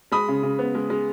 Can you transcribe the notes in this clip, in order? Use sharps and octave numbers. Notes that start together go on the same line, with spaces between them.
G#3 B5 D#6
C#3
C#3
B3
G#3
G#3